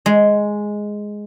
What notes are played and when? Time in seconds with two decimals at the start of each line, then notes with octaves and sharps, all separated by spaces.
0.06 G#3